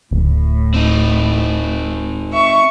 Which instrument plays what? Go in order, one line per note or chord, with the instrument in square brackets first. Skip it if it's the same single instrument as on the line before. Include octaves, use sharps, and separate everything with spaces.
[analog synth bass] D1 [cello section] A2
[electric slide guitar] C4 D#4
[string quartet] E5 C#6